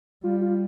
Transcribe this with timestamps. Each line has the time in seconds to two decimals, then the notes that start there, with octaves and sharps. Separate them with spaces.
0.23 G3 F4
0.42 F4